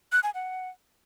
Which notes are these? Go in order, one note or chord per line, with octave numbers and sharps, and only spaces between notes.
F#6
G#5
F#5